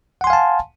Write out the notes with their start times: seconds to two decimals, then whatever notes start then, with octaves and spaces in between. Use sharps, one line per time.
0.21 F#5
0.24 C6
0.27 G#5
0.30 F5
0.33 A5